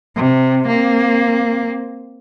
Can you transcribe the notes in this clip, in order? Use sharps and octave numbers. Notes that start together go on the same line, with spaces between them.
C3
A#3 C4